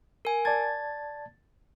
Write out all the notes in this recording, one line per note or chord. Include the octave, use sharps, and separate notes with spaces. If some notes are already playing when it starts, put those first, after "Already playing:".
A#4 G#5
D5 A5 G#6 A6